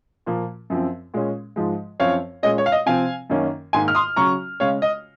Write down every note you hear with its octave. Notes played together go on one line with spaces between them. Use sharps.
A#2 F3 A#3
F#2 F3 C4
A#2 G#3 C#4
G#2 F3 G#3
F#2 F3 C4 C#5 F5
A#2 G#3 C#4 D#5
C#5
F5
D#5
C3 F3 C4 F5 G#5
F#2 D#3 A#3 C#4
G#2 D#3 A#3 G#5 C6
F6
C6 D#6
C#3 F#3 C#4 A#5 C#6
C#3 G#3 C#4 C#5 F5
D#5